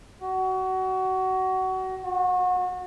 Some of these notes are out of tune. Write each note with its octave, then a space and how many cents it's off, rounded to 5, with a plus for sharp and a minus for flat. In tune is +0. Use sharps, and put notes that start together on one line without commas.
F#4 +25
F#4 -30